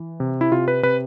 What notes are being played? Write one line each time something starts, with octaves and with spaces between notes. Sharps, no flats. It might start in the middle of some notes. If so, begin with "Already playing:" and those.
Already playing: E3
C3
E4
C3 F4
B4
C3 B4